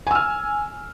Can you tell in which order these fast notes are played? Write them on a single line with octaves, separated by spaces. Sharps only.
G#5 E6 F6